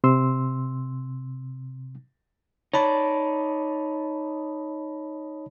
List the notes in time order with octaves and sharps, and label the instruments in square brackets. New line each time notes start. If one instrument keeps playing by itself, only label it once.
[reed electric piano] C3 C6 E6
[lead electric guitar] D#4 D5 [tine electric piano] C#5 A5 B5